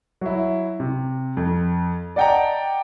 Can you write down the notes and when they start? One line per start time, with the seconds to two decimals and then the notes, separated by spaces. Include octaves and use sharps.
0.21 F#3 E4
0.80 C3
1.37 F2
2.16 D5 D#5 F#5 G5 A5 A#5